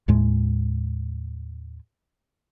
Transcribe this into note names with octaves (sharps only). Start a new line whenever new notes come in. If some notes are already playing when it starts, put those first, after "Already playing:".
D#2 A2 G#3